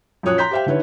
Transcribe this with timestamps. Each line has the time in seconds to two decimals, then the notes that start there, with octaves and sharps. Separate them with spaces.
0.23 F#2 A#2 F3 C#5 D#6 F#6
0.38 A#5 C6 G6 B6
0.51 G4 C5 E5 F5 G5
0.66 D3 D#3 E4 B4 C#5